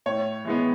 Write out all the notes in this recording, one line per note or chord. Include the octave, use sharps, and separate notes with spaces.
A2 C#5
E3 G#3 B3